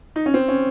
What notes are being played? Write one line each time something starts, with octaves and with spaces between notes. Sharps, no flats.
D#4
C#4
C4
C#4